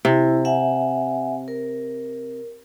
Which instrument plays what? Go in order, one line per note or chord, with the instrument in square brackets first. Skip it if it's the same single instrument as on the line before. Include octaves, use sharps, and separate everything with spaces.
[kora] C3 [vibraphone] E4
[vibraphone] E5 F#5 G#5
A#4